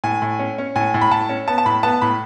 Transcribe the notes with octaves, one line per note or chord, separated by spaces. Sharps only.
A2 G#5
A2
C#4
C#4
A2 G#5
A2
B5
A2 A5
C#4
B3 A5
A5
A2 B5
B3 A5
A2 B5